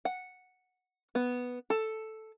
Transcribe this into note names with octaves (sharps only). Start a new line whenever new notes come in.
F#5
B3
A4